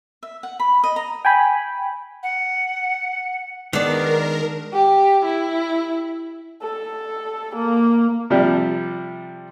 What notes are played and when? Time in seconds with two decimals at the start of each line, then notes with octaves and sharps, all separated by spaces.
0.23 E5
0.43 F#5
0.60 B5
0.83 D#5
0.96 A#5
1.25 G5 G#5 B5
2.22 F#5
3.73 D#3 G#3 B3 D4 A#4 D5
4.73 G4
5.25 E4
6.62 A4
7.55 A#3
8.30 C3 F3 G3 D4